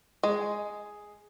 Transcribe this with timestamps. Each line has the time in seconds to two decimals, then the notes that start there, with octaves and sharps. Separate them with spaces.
0.23 G#3 G#4